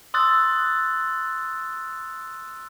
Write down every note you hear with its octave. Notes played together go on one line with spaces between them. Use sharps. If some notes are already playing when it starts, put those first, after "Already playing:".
C6 D#6 E6 F#6 A6